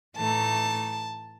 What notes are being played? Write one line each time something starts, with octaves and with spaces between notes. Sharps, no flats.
A2 E3 A3 D#4 A5